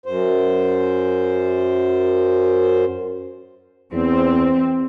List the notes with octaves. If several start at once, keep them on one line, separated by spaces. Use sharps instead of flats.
F#2 C5
E2 C4